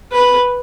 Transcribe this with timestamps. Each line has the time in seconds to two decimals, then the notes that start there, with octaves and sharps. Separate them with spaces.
0.12 B4